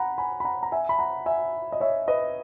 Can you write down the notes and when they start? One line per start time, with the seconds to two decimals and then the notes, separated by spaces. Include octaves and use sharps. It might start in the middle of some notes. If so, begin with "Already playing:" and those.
Already playing: F#5 A#5 B5
0.18 G#5 B5
0.40 B5
0.45 F#5 A#5
0.63 A#5
0.72 E5 G#5
0.89 B5
0.99 F#5 A#5
1.26 E5 G#5
1.72 D#5
1.80 C#5 E5
2.08 B4 D#5